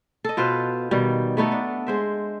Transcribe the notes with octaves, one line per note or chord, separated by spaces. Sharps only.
A4 D#5
B2 F4 B4 C5
B2 D#3 G3
A3 B3 D#4 A4
D4
G#3 C5 E5